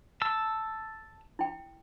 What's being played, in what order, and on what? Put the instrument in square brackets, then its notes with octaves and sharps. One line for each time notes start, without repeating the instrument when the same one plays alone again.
[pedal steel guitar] A5 E6
[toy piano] E4 G5